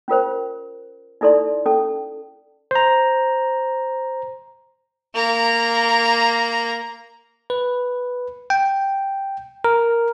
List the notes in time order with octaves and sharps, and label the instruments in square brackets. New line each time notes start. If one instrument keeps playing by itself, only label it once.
[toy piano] C#4 F4 A#4 C5
D#4 E4 A4 D5 C6
C#4 A4 A5
[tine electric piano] C5 A#5
[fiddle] A#3 A#5
[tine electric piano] B4
G5
A#4